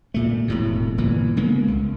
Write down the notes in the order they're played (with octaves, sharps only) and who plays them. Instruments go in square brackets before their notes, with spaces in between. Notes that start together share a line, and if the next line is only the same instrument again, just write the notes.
[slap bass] A#2 A3
E1 A2 C3
G1 A#2 E3
C#3 G#3 A#3 B3
C2